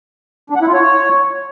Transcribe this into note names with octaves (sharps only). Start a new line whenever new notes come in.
D4
F#5
E4
F4
C#5